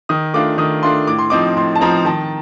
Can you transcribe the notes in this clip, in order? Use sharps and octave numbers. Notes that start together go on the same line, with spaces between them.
D#3 D#6
A3 D4 F4 D6
D#3 D#6
A3 D4 F4 C6
A2 D6
C6
F3 C4 D#4 D6
A2 C6
A5
F3 C4 D#4 A#5
D#3 A5